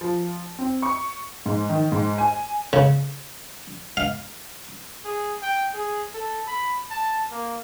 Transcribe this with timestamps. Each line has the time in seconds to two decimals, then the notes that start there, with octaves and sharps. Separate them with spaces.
0.01 F3
0.59 C4
0.82 C#6
1.46 G#2
1.69 D#3
1.92 G#2
2.18 G#5
2.73 C#3
3.97 F5
5.05 G#4
5.42 G5
5.74 G#4
6.14 A4
6.47 B5
6.90 A5
7.31 A#3